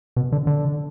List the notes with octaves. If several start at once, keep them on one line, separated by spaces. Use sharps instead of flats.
B2
D3
D3